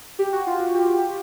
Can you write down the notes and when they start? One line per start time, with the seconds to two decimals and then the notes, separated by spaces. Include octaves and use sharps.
0.19 G4
0.33 F#4
0.47 F4
0.60 F#4
0.75 G4
0.94 G4